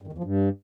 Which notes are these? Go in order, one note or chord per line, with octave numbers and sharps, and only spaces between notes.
G2
D#3
E2
F3
G2